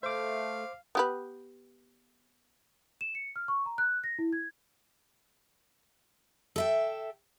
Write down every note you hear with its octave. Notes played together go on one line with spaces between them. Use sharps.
A3 C5 F5 D6
B3 G4 B4
E7
C#7
F6
C#6
A#5
F#6
A#6
E4
G#6
A4 E5 G5